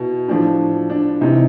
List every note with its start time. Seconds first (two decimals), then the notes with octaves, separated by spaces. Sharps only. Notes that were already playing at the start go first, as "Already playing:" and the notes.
Already playing: B2 E4
0.28 A2 F3 D4
0.90 D4
1.21 C3 E3 D#4